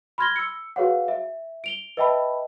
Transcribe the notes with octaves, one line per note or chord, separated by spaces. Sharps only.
B5 C6 F6 G#6 A#6 G7
E6 C#7
F#4 G#4 B4 C#5 F5 F#5
E5
D7 F7 G7
B4 D#5 E5 G5 A5 B5